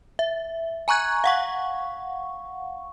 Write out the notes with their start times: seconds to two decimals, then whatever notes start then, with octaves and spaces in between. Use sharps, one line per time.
0.19 E5
0.88 G#5 A#5 C#6 F#6 G#6
1.24 F5 F#5 C#6